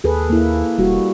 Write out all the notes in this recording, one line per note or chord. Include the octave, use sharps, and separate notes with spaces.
D#2 G#4 A4 B4
A#3 E4
E1 G3 F#4